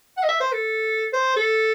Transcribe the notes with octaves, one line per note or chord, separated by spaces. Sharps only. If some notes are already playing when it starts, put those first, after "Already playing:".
F#5
D#5
E5
C5
A4
C5
A4